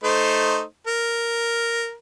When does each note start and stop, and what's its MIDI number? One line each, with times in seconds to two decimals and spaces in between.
0.04 0.62 57
0.04 0.62 63
0.04 0.62 72
0.87 1.94 70